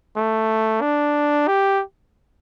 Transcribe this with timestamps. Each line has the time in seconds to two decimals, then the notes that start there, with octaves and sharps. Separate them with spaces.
0.16 A3
0.82 D4
1.48 G4